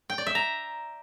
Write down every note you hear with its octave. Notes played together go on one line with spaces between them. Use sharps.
G5
D5
E5
A#5